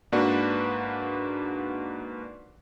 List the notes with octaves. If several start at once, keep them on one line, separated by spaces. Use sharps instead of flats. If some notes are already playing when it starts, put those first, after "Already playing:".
G#2 A#3 D4 F#4 B4 D5